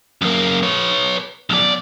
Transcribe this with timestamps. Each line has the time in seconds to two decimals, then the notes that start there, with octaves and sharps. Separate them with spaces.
0.22 F#2 A#3
0.63 B4 C#5
1.50 B1 D5